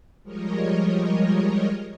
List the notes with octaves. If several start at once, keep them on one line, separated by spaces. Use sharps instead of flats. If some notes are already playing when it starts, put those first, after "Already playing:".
F3 G3 G#3 A#4 C#5 D#5